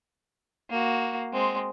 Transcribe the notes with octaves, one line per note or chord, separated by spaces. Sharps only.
A#3 F#4
G#3 C4